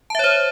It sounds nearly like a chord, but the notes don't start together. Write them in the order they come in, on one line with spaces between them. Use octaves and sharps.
A5 E5 C#5 C5